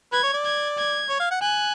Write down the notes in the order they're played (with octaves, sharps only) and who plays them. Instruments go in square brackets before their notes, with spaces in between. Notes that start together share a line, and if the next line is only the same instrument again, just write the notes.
[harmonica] B4 [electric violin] G#6
[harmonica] C#5
D5
[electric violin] G#6
G#6
[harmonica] C#5
F5
F#5
[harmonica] G#5 [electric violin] F#6